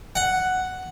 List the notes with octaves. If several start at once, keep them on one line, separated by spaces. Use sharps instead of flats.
F#5